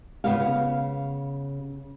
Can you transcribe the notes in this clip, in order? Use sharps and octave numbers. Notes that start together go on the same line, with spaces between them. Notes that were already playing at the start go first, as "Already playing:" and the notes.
C#3 B3 F5